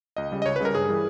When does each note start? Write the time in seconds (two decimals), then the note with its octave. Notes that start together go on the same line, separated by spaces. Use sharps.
0.17 C#2 D#5
0.32 C#3 G3
0.42 D#5
0.46 C#2 C#5
0.56 B4
0.60 C#3 G3 A#4
0.75 G2 G#4
0.89 E3 G3